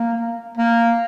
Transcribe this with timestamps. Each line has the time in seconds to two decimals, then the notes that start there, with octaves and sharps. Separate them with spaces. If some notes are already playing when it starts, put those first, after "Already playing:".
Already playing: A#3
0.57 A#3